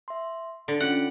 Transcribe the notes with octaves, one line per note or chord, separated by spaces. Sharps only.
E5 C6
D3 D7
C#4 F4 F#5